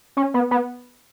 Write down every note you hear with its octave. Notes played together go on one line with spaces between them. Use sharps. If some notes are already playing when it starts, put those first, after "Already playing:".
C#4
B3
B3